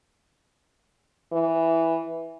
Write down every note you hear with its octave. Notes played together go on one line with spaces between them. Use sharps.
E3